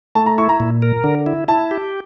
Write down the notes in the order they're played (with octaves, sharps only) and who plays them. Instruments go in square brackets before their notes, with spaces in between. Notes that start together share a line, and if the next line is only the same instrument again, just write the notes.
[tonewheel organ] A3 [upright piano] A5
[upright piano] A#5
[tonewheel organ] E4 [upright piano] C#6
[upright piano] A#5
[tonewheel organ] A#2
A#4
D3
E4
[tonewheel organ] E4 [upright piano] A5
[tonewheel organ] G4